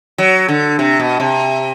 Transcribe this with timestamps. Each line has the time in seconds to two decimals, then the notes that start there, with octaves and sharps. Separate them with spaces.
0.18 F#3
0.48 D3
0.79 C3
0.99 B2
1.20 C3